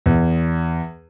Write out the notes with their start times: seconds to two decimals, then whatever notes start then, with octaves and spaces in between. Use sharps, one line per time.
0.06 E2